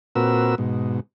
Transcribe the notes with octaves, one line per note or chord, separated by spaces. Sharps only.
A#2 C4 F#4 A#4 B4 E6
G#2 B2